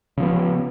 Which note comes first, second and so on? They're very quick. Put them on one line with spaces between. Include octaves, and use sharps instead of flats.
C#3 F3 B3